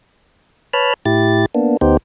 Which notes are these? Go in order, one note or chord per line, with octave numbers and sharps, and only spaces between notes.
B4 C#5 A5 B5 F6
A2 E4 G4 A6
A#3 B3 D4
D2 B3 D#4 G4 C5